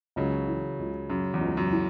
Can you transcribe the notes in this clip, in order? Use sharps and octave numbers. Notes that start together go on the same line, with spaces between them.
C#2 C#3 F#3
E3
C#2
F#2 C#3
E2
C#2
F#2
E3